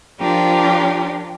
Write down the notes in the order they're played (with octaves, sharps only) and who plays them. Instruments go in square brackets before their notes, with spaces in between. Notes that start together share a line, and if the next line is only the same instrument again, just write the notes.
[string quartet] F3 D4 F4 G4 A#4